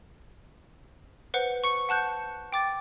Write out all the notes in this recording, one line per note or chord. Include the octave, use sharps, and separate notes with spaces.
B4 C5 F#5
C#6 C#7
F#5 A5 F#6 G6
G5 D6 A6